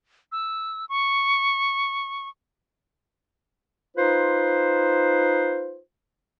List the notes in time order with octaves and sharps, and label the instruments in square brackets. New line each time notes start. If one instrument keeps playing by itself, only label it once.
[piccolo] E6
C#6
[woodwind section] D#4 F4 B4 C5